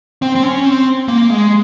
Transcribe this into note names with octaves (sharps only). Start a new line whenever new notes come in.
C4
C4
C#4
C4
A#3
G#3